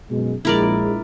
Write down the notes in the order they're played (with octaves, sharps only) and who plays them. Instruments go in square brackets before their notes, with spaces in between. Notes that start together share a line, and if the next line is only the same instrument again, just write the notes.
[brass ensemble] F#2 B2 G#3
[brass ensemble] A#1 G#3 [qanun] E4 A#4 D5